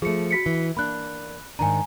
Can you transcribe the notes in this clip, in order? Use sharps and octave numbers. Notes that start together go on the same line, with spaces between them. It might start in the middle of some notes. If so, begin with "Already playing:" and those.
F3 A3 G#4 C#7
F#4 B6 C#7
E3
A#3 D4 B5 F#6
G#2 D#3 D4 G#5 A#5